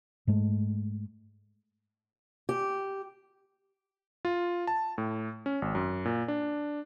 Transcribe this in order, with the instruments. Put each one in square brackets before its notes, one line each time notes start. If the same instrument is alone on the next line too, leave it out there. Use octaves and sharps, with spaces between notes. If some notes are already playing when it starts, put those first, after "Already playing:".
[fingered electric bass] G#2 G#3 A3
[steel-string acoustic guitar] G4
[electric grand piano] F4
A5
A2
C#4
G#1
F#2
A#2
D4